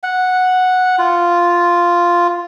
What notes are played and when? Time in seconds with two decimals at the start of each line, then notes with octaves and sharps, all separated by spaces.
0.03 F#5
0.99 F4